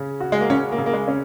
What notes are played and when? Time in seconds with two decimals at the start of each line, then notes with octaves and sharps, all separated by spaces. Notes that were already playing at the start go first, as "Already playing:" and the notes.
Already playing: C#3 C#4
0.20 F#4
0.32 G#3
0.41 A#3
0.50 C#3 C#4
0.72 A#3
0.78 C#3
0.86 A#3
0.93 G#3
1.08 C#4